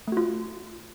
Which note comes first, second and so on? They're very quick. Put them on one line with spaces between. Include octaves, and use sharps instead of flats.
A3 F#4 F4